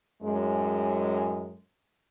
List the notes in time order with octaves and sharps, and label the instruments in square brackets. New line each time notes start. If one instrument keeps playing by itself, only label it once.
[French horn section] F#2 A2 G#3